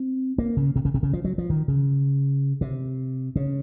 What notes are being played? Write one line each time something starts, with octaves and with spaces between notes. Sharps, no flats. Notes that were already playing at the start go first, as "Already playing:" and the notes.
Already playing: C4
A#3
C#3
C3
C#3
C3
C#3
F3
F#3
F3
D#3
C#3
C3
C#3